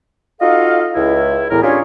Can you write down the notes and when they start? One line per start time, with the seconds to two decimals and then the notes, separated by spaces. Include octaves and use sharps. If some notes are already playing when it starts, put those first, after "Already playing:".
0.41 D#4 F4 F#4 A4 D#5 F5
0.95 C#2 E4
1.51 E2 A2 A#4
1.63 C#4 D4 F4 G4 G#4 C#5